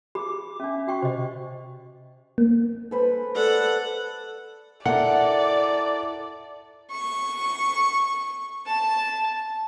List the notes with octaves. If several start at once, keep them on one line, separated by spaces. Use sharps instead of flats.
G4 G#4 B5 D6
C#4 D4 E5
F#4 G5 C#6
C3 C5 D#5
A#3
A4 B4 C5
A4 D5 F#5
E4 A4 A#4 D5 F#5
C#6
A5